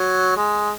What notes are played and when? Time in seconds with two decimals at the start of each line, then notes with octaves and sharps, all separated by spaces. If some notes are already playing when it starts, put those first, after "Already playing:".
Already playing: F#3
0.36 G#3